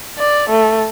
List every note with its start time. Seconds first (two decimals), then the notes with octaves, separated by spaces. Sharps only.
0.18 D5
0.50 A3